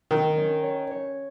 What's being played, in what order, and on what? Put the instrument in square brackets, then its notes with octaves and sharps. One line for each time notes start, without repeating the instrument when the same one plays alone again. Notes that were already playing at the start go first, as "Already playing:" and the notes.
[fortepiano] D#3 [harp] A#4
[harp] C#4
C#5
C#5